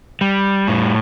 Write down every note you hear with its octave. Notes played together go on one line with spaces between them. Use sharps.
G3
A2